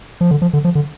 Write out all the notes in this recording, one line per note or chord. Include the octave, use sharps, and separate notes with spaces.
F3
D3
F3
D3
F3
D3